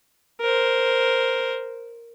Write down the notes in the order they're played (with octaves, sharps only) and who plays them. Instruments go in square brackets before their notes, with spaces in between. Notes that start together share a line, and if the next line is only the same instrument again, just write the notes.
[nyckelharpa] A#4 C5